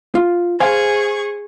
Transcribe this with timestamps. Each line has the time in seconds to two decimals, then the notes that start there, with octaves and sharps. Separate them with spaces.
0.15 F4
0.60 G#4 C5 F5 G#5 C#6